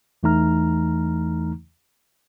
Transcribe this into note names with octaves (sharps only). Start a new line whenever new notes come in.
E2 E3 A3 D#4 A#5 F6